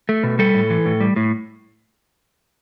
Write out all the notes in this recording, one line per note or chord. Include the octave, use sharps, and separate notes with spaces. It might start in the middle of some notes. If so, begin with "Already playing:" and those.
A3
B2
G3 A4
A2
E3
A2
G3
A2